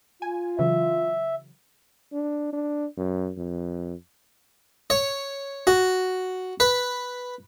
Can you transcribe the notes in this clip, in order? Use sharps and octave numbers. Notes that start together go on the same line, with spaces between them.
F4 G#5
C#3 E3 F#3 E5
D4
D4
F#2
F2
C#5
F#4
B4